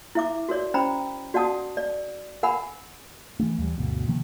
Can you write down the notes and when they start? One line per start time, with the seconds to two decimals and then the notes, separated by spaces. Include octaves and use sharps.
0.15 E4 E5 D6
0.49 F#4 A#4 C#5 D5
0.74 C#4 C5 G5 A#5 B5
1.34 F#4 D5 F#5 A5 D#6
1.77 D5
2.43 A#4 F#5 G#5 B5
3.40 E3 A3
3.58 D#2 E3 G3
3.77 G1 D2 B2
4.08 C3 D#3 F3 A#3